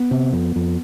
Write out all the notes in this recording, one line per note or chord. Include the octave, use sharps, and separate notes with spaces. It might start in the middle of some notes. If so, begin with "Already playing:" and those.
Already playing: B3
C3
F2
F2